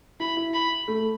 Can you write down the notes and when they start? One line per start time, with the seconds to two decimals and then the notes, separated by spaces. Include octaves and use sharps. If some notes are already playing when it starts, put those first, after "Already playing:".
0.20 E4 B5
0.37 E4
0.54 B5
0.88 A3